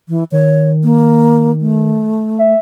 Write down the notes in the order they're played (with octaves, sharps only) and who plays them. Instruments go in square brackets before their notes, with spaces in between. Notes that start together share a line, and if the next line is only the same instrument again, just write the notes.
[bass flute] E3
[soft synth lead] D#3 [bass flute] C#5
[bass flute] A#3
A3
[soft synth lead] E5